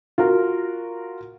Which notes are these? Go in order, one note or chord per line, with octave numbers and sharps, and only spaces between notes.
F4 F#4 A#4